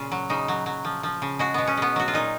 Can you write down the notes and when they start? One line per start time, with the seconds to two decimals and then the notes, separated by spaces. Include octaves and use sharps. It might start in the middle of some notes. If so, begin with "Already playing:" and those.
Already playing: A#2 C#3 F4
0.12 F#3
0.30 C#3 D#4
0.48 F#3
0.66 F#3
0.85 F3
1.03 F3
1.22 C#3
1.39 G#3 F#4
1.54 B2 B3
1.67 C#4
1.77 G#3 B3
1.96 F#3 F#4
2.08 F4
2.14 A#2 D#4